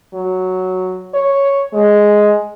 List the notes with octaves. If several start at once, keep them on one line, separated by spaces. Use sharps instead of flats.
F#3
C#5
G#3